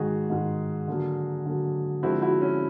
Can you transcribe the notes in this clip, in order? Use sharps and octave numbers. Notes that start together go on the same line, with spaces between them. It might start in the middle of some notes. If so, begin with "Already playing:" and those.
Already playing: G#2 D#3 G#3 F#4 G#4
G#2 D#3 G#3
D3 F#3 A#3
D3 F#3 A#3
D3 F3 G#3 C4 E4 F#4
E4 F#4
C#4